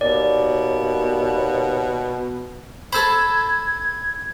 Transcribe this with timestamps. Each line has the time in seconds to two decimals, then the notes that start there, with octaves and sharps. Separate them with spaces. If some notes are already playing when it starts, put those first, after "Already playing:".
0.01 D#2 B2 D5
2.93 A4 C5 B5 E6 G#6